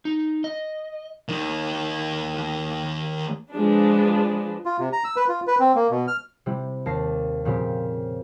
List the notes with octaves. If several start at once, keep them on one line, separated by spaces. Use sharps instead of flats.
D#4
D#5
D#2 D#3
F3 G#3 D4 B4
F4
C3
A#5
E6
B4
F4
B4
C4
A#3
B2
F6
C3 G3 E4 G4
D#2 A5 A#6 C7
F2 A#2 C#3 C4 G4 B6